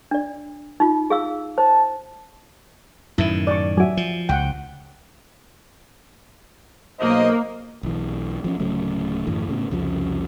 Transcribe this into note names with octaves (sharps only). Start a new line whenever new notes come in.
D4 D5
D#4 F4
G#4 F5 E6
C5 A5
F#2 A2 D#3 E4
D5 C#6
F#3 F#4 E5 G#5
F3
C#2 F#5 G5
B1 A#3 C5 D#5
B1 E3
F3 C4 C#4
D1 C#3 F#3 A3
F#2 A2 D3 E3
A2 C#3 A#3 B3
C2 F2 C#3 F3